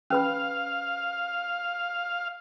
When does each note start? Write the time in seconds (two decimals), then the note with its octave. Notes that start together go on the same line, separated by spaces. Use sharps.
0.10 C#4 B4 F5 B5